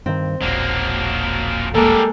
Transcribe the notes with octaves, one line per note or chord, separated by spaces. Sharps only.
G2 D#3 C4
E1 A#1 F#3 A#3
G3 G#3 A#3 A4 A#4